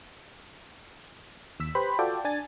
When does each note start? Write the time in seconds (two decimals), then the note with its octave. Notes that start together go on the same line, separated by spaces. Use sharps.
1.60 D#2 E6 B6
1.75 G4 B4 C5 B5
1.99 F4 F#4 A4 D5 G5
2.25 D4 G#5 A6